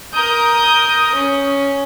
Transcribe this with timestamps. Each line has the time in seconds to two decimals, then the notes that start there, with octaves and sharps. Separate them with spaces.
0.14 A#4 D#6 G6
1.13 C#4